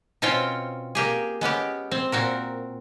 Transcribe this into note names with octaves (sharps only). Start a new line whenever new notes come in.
B2 C4 C#4 F4 C#5 G5
A#3 G4 G#4
G#3 B3 C#4 G4
C4
A#2 C4 F#4 A#4